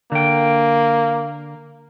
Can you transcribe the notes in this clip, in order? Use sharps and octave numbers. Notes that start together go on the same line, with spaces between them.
D3 A#3 G5